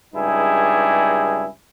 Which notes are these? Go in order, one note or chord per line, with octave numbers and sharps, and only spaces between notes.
C#2 G2 D#4 E4 G#4